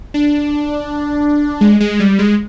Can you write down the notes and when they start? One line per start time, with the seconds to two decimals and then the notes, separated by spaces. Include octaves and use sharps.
0.14 D4
1.61 G#3
1.80 G#3
2.00 G3
2.19 G#3